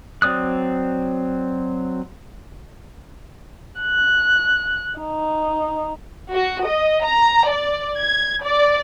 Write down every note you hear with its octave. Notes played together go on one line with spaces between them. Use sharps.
F#3 C4 D5 D#6 F#6
F#6
D#4
F#4
D#5
A#5
D5
G#6
D5